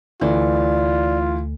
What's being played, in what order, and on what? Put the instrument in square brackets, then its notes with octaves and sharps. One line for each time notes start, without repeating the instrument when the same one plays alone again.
[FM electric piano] D2 A3 [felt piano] E3 [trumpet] F4 [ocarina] D5